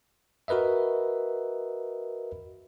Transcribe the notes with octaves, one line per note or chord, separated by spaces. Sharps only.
F#4 A#4 B4 D#5 E5